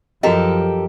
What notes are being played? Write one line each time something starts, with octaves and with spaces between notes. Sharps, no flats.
F#2 F3 F#4 G4 A4 A#4 D#5